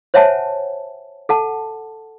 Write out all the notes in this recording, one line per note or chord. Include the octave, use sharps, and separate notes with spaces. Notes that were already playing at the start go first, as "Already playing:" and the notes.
C5 C#5 E5 F#5 G#5 A5
A4 F#5 A5